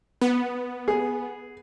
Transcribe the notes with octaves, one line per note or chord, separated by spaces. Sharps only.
B3
G#4